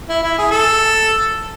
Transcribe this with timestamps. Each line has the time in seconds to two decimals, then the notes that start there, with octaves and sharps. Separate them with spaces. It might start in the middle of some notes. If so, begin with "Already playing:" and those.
0.09 E4
0.23 E4
0.38 G#4
0.51 A4